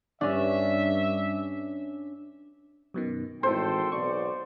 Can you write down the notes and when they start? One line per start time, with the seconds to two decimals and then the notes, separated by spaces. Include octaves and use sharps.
0.21 G2 C#4 D4 E5
2.94 F#2 B2 D#3
3.43 G#1 A2 E3 A4 C5 G5
3.92 B1 D5 C#6